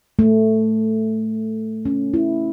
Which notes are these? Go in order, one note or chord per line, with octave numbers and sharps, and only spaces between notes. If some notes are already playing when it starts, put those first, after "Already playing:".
A3
C#4
E4